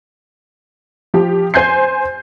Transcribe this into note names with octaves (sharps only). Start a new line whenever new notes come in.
F3 G4
C5 G#5 G6 G#6 C7